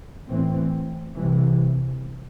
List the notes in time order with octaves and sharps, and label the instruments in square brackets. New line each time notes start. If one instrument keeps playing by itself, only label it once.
[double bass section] A2 E3 C4
C2 C3 E3